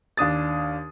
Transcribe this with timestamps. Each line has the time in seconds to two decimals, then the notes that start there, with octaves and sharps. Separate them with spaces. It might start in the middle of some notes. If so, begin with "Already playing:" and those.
0.17 D#2 D4 D#6 A6